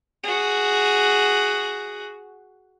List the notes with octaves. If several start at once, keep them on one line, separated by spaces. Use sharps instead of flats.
F#4 G#4